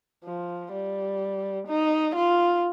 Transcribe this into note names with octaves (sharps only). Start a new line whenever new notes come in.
F3
G3
D#4
F4